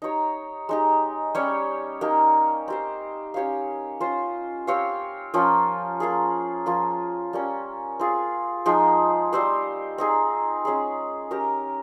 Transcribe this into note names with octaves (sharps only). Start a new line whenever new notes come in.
D#4 G4 C#5
G#3 D#4 G4
G3 C#4 G4 C#5
A#3 D#4 G4
C4 G4 C5
C#4 G4 C#5 F5
C#4 F4 C5
C4 G4 C#5 F5
F3 A#3 C#4 F4
A#3 F4 G#4
F3 A#3 F4
G3 A#3 C#4
C4 F4 G#4
F3 G#3 D#4 G#4
G3 C4 G4 C5
C4 D#4 G#4
G#3 C#4 G#4
C#4 G4 A#4